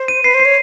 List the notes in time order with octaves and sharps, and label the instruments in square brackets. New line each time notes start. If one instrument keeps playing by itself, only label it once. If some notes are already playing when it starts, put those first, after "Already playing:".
Already playing: [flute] C5
[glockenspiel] D#7
[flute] B4 [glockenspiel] C7
[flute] C5
[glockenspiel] C7
[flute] C#5